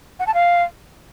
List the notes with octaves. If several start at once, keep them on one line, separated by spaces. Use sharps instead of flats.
F#5
A5
F5